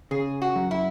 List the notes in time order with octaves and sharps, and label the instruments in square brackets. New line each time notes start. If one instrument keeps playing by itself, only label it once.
[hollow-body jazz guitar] C#3 [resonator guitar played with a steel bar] G#4
[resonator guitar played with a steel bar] F#4
[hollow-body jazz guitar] F#2
[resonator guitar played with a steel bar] E4